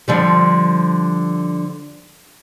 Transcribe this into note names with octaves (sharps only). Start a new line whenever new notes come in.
D3 F3 G3